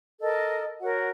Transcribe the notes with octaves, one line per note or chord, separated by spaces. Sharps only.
A4 A#4 D#5
F#4 A#4 C#5 F#5